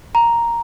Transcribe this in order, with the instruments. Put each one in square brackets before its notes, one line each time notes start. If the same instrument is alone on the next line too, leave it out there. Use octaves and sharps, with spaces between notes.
[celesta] A#5